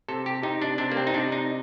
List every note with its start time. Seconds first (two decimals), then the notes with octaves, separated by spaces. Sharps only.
0.08 C3 A4
0.26 G4
0.43 C3 D#4
0.62 D4
0.78 C3 D4
0.92 A#3
0.97 C4
1.07 D#4
1.14 C3 D4
1.32 D#4